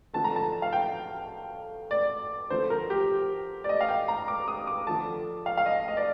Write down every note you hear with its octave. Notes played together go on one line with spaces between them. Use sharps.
D3 F3 A3 A5
A#5
A5
F5
G5
D5
D3 F3 A3 C5
A#4
G4
D5
D#5
F5
G5
A#5
D6
D#6
D6
D3 F3 A3 A5
F5
F5
D#5
D#5
D5